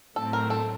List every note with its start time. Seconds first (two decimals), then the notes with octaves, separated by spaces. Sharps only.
0.16 A2 F#3 A3 C4 A4
0.33 A#4
0.50 A4